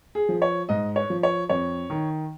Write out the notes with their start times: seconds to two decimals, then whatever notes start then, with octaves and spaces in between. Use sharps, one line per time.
0.15 G#4
0.29 F3
0.42 C#5
0.69 G#2 D#5
0.96 C#5
1.10 F3
1.23 C#5
1.49 F2 C#5
1.90 D#3